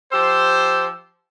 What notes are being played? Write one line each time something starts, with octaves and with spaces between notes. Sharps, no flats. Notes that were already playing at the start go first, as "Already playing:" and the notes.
F3 G4 C5 E6